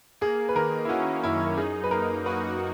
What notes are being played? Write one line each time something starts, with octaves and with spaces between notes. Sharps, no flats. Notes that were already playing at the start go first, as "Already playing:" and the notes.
A#3 G#4
B4
D#3 A#4
E4
C#4 F#4
F#2 E4
D#4 G#4
B4
A#3 A#4
F#4 B4